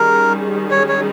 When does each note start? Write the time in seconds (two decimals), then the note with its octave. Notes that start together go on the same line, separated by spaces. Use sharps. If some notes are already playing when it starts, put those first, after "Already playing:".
Already playing: D#3 G3 C#4 G#4 A#4
0.71 C#5
0.88 C#5